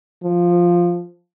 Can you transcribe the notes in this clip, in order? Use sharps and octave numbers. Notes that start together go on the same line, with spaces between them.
F3